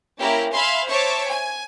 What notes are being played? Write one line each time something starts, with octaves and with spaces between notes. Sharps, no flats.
A#3 C#4 E4 G4 A#4
E5 F5 G#5 B5 C6
C5 C#5 E5 A5 C#6 D6
G#5